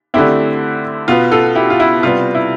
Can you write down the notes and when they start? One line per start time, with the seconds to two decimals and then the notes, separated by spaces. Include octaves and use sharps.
0.14 D3 A3 C4 E4 G4
1.08 B2 B3 F4
1.32 F4 A4
1.55 E4 G4
1.70 F4
1.80 E4
2.03 C3 G3 B3 F4
2.35 E4